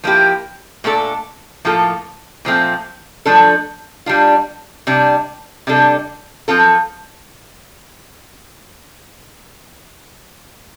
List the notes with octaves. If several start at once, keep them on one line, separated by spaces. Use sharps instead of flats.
F3 A#3 E4 G4
A#2 A3 D4 A4
A2 F3 A#3 F4 A4
A#2 F3 A3 C4
F3 A3 D4 A4
G3 D4 F4
C3 G3 D4
C3 G3 D4 A4
F3 C4 F4 A4